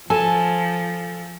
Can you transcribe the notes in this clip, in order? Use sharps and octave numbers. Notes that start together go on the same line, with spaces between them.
F3 A4 G#5